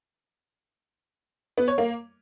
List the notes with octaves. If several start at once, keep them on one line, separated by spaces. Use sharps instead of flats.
B3
C#5
A#3